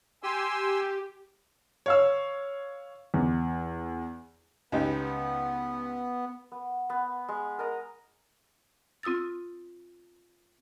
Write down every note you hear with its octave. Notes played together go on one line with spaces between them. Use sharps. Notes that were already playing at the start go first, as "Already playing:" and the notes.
G4 G#5 C6 E6
C#5 F5 E6
E2
C#2 B3 D#4 G4
B3
B3
G#3
A#4 D#5 A#5
C4 F4 D#6 E6 A6